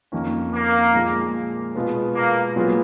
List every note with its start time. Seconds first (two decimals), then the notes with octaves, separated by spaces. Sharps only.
0.12 F2 D#3 A#3 C#4
0.53 A#3
0.94 A#2 F3 G#3
1.75 B2 G#3 B3 F4
2.15 A#3
2.56 A#2 F#3 B3 F4 G#4